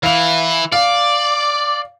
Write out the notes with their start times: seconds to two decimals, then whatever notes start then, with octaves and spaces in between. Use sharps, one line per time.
0.03 E3 E4 F5 F7
0.72 D5 F5